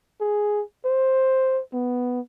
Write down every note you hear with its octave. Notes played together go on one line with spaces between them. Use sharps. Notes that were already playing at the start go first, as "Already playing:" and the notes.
G#4
C5
B3